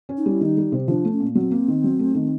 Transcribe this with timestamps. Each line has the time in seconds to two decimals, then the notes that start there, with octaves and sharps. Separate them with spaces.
0.09 C#4
0.18 D#4
0.26 G3
0.31 E4
0.41 D#3 D#4
0.57 G3
0.72 C3
0.88 F3 D4
1.05 A3
1.12 C#4
1.20 A#2
1.35 F#3 C4
1.51 A#3
1.68 D#3
1.84 F#3
1.99 A3
2.15 D#3